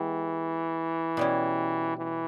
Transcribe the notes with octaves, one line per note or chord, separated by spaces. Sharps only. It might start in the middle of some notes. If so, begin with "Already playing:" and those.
Already playing: E3 G#3 B3 G4
B2 G3 C#4
E3